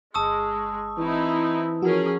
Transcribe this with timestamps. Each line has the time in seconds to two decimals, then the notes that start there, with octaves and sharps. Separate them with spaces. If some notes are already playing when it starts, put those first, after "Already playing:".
0.14 G1 G#3 A5 C#6 D#6 E6
0.98 E3 C4 D#4 E4
1.82 F3 C#4 F#4 G#4 A#4